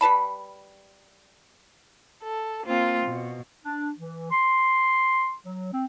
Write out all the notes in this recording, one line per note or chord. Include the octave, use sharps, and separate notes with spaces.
G3 B4 A5 B5
A4
A#3 C4 F4
B2
D4
E3
C6
F#3
C4